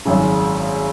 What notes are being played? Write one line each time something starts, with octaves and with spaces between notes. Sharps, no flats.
G#1 F#2 C#3